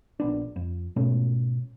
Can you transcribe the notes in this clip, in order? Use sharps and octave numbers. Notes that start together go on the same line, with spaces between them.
A#1 B3 D4
F2
G#2 B2 A3 C#4